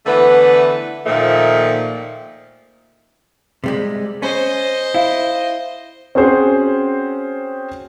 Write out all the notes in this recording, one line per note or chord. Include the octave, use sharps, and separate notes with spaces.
D3 E3 A3 B3 B4
A#2 D#3 F3 A3 A#3
C3 G3 G#3
C#4 C5 D#5
E4 F5
C4 C#4 F#4 G#4 C5